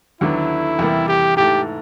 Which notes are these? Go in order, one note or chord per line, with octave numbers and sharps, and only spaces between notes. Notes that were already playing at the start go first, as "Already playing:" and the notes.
D#2 D3 F#3 B3 D4 E4
E2 C3 E3 G3 A#3
G4
G#2 E3 A3 G4